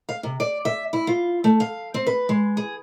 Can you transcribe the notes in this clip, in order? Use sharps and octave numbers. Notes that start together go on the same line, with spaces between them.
F5
C3
D5
E5
E4
F4
A3
F5
C4
B4
G#3
G#4